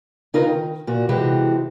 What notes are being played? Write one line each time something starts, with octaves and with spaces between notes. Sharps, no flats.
C#3 D#4 F4 A#4 B4 D#5
D#3
A#2 F#4
C3 E3 G#3 F#4 G4